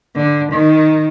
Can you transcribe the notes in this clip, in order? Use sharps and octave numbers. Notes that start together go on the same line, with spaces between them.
D3
D#3